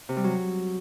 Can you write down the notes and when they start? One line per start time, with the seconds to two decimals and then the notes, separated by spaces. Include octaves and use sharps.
0.09 C3
0.16 G3
0.24 F#3